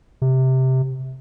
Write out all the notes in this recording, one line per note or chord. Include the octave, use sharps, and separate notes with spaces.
C3